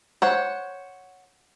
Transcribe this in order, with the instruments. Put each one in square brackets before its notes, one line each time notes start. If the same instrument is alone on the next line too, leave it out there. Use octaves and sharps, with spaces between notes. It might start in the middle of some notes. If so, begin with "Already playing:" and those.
[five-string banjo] C5 C#5 F#5